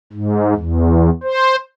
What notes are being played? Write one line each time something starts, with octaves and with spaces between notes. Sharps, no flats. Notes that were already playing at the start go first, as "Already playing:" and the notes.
G#2
E2
C5